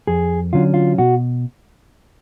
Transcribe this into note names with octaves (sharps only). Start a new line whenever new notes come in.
F2 G#4
D3 F#3 C#4 F4
F4
B2 F#4